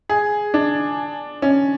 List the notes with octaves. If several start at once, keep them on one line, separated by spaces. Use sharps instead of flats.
G#4
D4
C#4